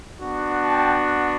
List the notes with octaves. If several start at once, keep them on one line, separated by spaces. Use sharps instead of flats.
B3 D4 F#4
G5 A5